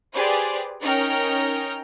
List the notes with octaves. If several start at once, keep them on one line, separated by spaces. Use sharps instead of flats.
G4 G#4 B4 C5 D5
C#4 D#4 A#4 G5 F6